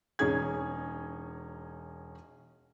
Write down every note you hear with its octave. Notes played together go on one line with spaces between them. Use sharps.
E1 C#4 D#4 G#4 G#6